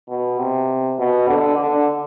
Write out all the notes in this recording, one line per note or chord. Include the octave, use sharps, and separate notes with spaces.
B2
C3
B2
D3
D3